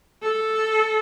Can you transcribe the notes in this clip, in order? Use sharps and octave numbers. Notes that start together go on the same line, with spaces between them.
A4